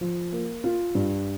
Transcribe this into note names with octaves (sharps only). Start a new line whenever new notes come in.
F3
A#3
F4
G2